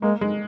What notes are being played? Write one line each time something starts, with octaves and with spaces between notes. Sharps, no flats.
G#3 A#3
G#3